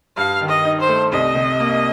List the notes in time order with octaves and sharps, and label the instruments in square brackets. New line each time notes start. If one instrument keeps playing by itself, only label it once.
[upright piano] G2 [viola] F5
[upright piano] D#3
[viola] D#5
[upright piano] D#4
[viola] C5
[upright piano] A3
[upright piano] C2 [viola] D#5
[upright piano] C3
A#3